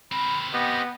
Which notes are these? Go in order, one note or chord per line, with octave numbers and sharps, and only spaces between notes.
C4 A#4 B5
B3 G4 D#5 B5